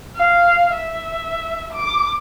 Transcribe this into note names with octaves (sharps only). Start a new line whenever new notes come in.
F5
E5
D6